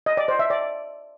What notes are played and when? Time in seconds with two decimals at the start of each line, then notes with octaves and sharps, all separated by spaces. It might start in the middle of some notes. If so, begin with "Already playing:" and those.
0.06 D#5
0.17 D5
0.28 C5
0.39 E5
0.50 D5